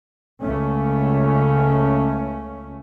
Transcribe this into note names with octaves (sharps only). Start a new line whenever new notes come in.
C#2 A3 C#4